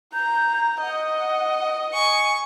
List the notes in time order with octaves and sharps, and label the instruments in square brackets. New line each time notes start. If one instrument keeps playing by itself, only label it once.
[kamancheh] A#5 [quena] G6
[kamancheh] D#5 [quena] F#5
[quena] G#5 [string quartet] C#6